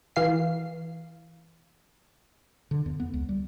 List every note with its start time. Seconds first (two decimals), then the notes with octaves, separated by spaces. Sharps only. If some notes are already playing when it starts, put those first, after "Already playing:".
0.16 E3 F5 C7
2.71 D3
2.86 E2
3.00 B3
3.14 C#2
3.29 G3